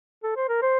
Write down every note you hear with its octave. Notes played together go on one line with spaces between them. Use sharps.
A4
C5
A#4
C5